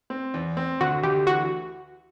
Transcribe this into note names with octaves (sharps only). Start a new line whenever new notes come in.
C4
E2
C4
D2 F#4
D2 G4
E3 F#4